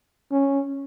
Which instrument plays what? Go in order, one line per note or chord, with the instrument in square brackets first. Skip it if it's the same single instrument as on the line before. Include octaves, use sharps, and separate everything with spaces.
[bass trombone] C#4